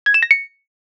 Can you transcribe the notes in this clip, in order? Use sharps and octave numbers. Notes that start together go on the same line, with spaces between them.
G#6
E7
A#6
C#7